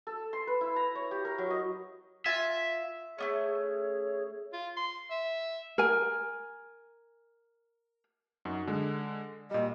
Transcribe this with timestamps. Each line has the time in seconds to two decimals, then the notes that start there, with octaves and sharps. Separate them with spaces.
0.07 A4
0.33 C6
0.47 B4
0.61 E4
0.76 A#5
0.95 C#5
1.11 G4
1.25 A#4
1.38 F#3
1.50 D#5
2.26 F4 E5 G#5
3.18 A3 B3 C#4 G#4 C#5
4.53 F4
4.77 C6
5.10 E5
5.78 A#4 G#5
8.45 F#2 D#4 F#4
8.67 D3 G#3
9.51 A#2 G3 D#5